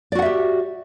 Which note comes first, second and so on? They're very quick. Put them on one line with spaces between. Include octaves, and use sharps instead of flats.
D5 F#4 F#5 E5 G4